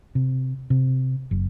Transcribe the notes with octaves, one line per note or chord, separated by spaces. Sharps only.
C3
C3
F#1